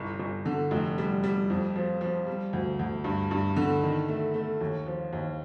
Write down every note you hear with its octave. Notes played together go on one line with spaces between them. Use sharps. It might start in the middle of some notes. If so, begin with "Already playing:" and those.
Already playing: G1 C2
G1
D3
F1
G3
G3
F2
F3
F3
G3
D2
D2
G2
G2
D3
D#3
A3
A3
D#2
F3
D#2